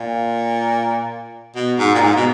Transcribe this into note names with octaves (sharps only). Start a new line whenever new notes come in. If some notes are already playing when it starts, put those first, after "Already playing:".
Already playing: A#2
B2
G#2
A#2
G#2
B2